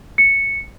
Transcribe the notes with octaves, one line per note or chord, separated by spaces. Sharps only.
C#7